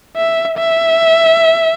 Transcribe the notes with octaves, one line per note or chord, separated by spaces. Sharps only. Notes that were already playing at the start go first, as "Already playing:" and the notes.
E5
E5